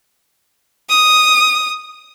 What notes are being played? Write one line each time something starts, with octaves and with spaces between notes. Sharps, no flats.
D#6